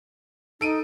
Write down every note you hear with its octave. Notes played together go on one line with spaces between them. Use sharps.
D#4 A4 D7 D#7